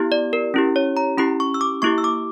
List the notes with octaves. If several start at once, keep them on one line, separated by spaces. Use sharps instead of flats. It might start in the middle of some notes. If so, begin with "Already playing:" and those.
Already playing: B3 E4 G4
D5
A#4
C#4 E4 G4
C#5
A#5
C#4 E4 G4 B5
C#6
E6
D6
A#3 E4 G4 C#6
E6
D6